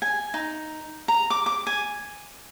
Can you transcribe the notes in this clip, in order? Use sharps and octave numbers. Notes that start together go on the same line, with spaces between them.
G#5
D#4
A#5
D6
D6
G#5